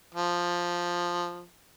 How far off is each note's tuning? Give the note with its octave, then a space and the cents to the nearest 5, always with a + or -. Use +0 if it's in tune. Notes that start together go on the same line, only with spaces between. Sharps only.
F3 +5